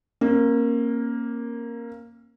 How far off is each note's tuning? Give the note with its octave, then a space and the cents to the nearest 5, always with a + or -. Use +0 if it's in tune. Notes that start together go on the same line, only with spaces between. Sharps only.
A#3 +0 C#4 -40